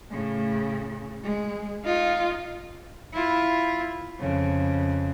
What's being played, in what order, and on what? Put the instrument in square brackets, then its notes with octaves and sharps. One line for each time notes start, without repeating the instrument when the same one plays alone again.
[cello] A2 C#3
G#3
[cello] D#4 [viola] F4
[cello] E4 F4
F2 C#3